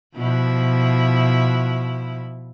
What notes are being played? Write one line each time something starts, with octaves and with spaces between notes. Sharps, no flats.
B2 F3 E4